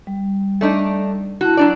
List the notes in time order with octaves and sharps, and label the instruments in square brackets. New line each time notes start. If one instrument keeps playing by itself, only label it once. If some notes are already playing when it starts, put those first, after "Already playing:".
[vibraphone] G3
[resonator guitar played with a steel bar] A3 D4 D#4
[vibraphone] E4 A5 [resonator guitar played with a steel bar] F#4
[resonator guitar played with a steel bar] F#3 D4 D5